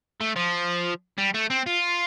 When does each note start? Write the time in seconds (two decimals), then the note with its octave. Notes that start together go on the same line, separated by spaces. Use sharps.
0.21 A3
0.36 F3
1.18 G3
1.34 A3
1.50 C4
1.66 F4